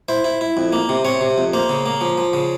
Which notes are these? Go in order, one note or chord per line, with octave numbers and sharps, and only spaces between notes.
E4 C5
E4
E4
F2
A#3
C3
C3 C#5
C3
F2
A#3 C5
C#3
A#3
F3
F3
C#3